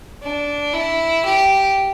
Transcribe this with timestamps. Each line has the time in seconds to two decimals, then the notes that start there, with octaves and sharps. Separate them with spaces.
0.23 D4
0.74 E4
1.25 G4